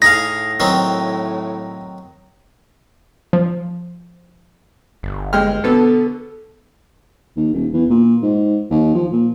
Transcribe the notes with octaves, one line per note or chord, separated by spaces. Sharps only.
A2 D#4 G#4 F5 A#6
D#3 F#3 C4
F3
G1
G#3 G5 F6
B2 D3 B3 A4
D#2
D#1
E2
A#2
G#2
D#2
F3
A#2